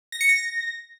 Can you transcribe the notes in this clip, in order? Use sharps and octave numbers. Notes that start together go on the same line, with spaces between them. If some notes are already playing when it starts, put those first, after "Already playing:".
A#6
C#7
A#6